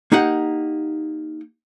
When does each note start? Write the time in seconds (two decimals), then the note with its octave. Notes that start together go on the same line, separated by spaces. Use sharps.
0.12 A#3 D#4 G4 F#5